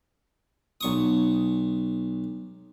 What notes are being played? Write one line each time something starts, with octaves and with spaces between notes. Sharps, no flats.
B1 C#6 D#6